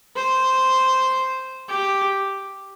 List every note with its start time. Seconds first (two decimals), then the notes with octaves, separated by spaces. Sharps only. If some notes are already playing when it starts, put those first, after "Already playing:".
0.16 C5
1.69 G4